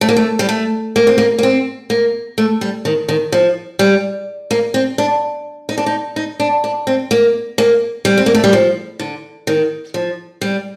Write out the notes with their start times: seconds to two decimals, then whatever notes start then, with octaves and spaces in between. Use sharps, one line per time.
0.01 A3
0.09 A#3
0.16 A3
0.39 G3
0.49 A3
0.96 A#3
1.07 C4
1.18 A#3
1.38 A#3
1.43 C4
1.90 A#3
2.38 A3
2.61 G3
2.85 D#3
3.09 D#3
3.32 F3
3.79 G3
4.51 A#3
4.74 C4
4.98 D4
5.69 D#4
5.78 D4
5.86 D#4
6.16 D#4
6.40 D4
6.64 D4
6.87 C4
7.11 A#3
7.58 A#3
8.05 G3
8.17 C4
8.26 A#3
8.35 A3
8.44 G3
8.53 F3
8.99 D3
9.47 D#3
9.94 F3
10.41 G3